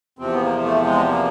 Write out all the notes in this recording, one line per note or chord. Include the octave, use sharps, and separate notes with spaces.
E2 C3 F3 C4
B3
A#3
A3
G#3
A#3